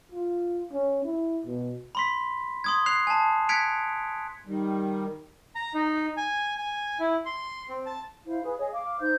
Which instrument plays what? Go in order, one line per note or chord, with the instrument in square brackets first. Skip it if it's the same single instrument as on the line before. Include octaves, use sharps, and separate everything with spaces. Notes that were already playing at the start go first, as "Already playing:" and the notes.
[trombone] F4
C#4
E4
B2
[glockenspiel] B5 C6 B6
C6 D#6 G#6
F#6 C7 F7
G#5 A5
F#6 G#6 B6 C#7 D7 F7
[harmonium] D#3 G3
[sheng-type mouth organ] A#5
D#4
G#5
G#5
E4
C6
C4
A5
[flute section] E4 C5 F5
G#4 B4
G#4 C#5 D#5
F5 D6
D#4 C5 G6